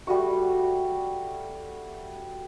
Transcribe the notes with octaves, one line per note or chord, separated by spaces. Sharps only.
G3 A3 F#4 C#6